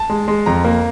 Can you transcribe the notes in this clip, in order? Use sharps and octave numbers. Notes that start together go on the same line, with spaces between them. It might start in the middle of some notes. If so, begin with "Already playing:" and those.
Already playing: A5
G#3
G#3
F2 A#5
A#3